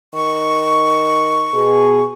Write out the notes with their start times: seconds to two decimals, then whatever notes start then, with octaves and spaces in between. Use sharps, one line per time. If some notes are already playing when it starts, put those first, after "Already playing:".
0.14 D#3 C#6
1.53 B2 G#4